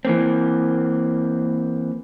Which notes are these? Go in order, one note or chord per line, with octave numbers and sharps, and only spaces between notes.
E3 A#3 C4